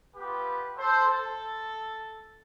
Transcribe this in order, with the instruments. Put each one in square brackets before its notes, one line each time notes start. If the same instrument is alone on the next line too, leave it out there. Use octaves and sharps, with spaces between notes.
[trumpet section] B3 F4 G4 B4
A4 C5
A4